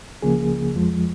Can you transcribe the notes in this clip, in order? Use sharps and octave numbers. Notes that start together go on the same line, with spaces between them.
C#2 C#3 F3 A#3 G#4
F2 F3 G#3